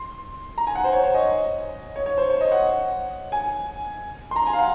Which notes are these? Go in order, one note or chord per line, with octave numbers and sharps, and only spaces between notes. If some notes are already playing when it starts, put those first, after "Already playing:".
Already playing: C6
A#5
G#5
F#5
C5
C#5
C#5
D#5
C#5
C#5
C5
C#5
D#5
F#5
G#5
C6
A#5
G#5
F5
F#5